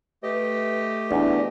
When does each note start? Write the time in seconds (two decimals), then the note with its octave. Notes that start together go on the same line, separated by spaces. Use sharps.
0.23 A3 G4 B4 D#5
1.11 E2 D4